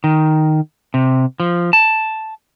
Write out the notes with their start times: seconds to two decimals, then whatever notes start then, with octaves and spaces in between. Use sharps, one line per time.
0.04 D#3
0.94 C3
1.40 F3
1.73 A5